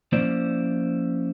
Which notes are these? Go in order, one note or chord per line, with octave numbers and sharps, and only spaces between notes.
F3 A#3 C#4 E4 C5 D5